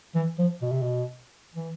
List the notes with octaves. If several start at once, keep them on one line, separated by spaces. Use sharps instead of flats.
E3
F3
B2
C3
B2
E3